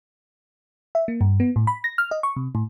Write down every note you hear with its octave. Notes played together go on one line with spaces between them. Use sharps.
E5
A#3
G2
B3
A2
B5
A#6
F6
D#5
C#6
C3
A2